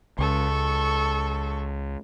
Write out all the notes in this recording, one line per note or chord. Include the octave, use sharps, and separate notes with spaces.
C#2 A4 C#6